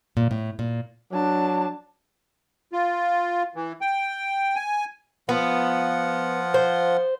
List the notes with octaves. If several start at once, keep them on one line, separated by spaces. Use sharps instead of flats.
A#2
A2
A#2
F#3 D4 A5
F4
E3
G5
G#5
F3 B3 F4 F#5
C5